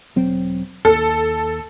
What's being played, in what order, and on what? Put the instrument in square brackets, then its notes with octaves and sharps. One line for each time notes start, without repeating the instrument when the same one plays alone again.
[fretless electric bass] E1 F#3 C4
[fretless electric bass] D#2 [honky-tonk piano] A4